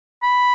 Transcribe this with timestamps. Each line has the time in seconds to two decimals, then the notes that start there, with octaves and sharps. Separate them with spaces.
0.23 B5